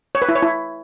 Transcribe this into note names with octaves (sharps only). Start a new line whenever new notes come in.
C#5
B4
E4
C#5
E4